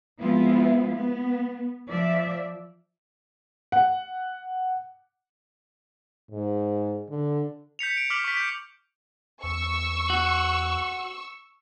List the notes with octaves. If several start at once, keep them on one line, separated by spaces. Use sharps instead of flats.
F3 G#3 B3 C4 E4 F4
B3
F3 D5 E5
F#5
G#2
D3
G6 B6 C#7 F7
D7
D6 F6 B6 D7 F7 F#7
C#6 B6
G6 C#7
E2 C#6 E6
F#4